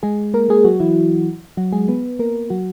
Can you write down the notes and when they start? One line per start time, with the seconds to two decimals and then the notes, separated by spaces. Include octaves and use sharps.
0.03 G#3 G#4
0.34 A#3 A#4
0.49 G#3 G#4
0.64 F#3 F#4
0.80 E3 E4
1.57 F#3 F#4
1.72 G#3 G#4
1.88 B3 B4
2.19 A#3 A#4
2.50 F#3 F#4